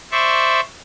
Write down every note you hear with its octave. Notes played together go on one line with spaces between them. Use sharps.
C5 D5 E5 C#6